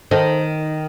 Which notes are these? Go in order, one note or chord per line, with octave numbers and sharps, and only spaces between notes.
D#3 A4 C5